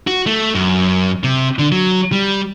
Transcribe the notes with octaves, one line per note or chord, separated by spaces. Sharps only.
F#4
A3
F#2
C3
D3
F#3
G3